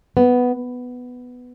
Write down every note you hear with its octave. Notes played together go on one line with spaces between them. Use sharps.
B3